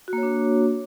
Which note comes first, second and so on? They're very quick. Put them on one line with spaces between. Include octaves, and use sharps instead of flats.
F#4 A#3 C#5 D4